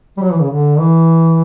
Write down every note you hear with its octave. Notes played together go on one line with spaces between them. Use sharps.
G3
F#3
E3
C#3
D3
E3